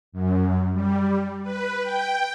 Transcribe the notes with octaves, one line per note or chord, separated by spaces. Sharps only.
F#2
G3
B4
G5